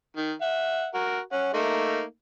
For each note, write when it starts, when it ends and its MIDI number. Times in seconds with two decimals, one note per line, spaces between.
0.17 0.33 51
0.42 0.86 76
0.42 0.86 78
0.94 1.19 66
0.94 1.19 70
1.32 1.51 61
1.32 1.51 78
1.54 2.02 57
1.54 2.02 58
1.54 2.02 63